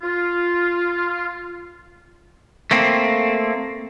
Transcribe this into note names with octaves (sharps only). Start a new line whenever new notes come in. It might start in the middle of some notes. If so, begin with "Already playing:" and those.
F4
A3 A#3 C4